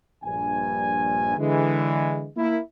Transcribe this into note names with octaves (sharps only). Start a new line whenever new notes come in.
A#1 G2 G#5
D3 E3 G#3
A#3 E4